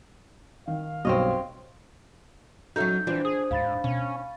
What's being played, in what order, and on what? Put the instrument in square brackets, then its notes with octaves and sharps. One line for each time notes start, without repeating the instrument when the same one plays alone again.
[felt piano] D#3 [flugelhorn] F5
[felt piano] B1 G2 [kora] C4 C#5 D#5
[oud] F#3 C#4 D#4 [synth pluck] F#4 A4 E5 [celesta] G6
[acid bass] E3 [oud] C4 D4 [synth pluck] F4
[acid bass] G#4 [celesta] D#6
[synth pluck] D2 G#6 [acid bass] G#2 [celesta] F5 B5 A6
[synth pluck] B2 [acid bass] C#4